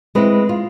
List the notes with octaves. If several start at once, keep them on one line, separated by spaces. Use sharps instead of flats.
G#3 C4 E4 B4
F4